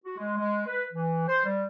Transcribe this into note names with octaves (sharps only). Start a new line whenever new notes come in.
F#4
G#3
G#3
B4
E3
C5
G3